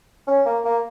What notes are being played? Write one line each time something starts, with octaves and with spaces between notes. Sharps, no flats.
C#4
A#3
A#3